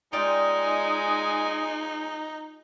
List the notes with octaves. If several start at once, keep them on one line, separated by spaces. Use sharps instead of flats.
G#3 D#4 F4 D5 G5 G#5 D#6